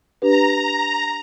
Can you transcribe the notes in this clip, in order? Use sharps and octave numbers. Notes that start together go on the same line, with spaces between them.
D4 G4 B4 A#5